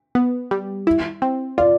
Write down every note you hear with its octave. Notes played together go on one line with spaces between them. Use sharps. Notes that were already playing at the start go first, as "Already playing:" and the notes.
B3
G3
E4
C4
F4 D5